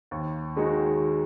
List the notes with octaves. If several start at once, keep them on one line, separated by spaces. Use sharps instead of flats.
D#2
D#3 G#3 D#4 F#4